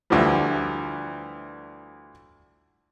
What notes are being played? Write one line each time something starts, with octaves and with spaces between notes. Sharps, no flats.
D2 D3 E3 F3 G3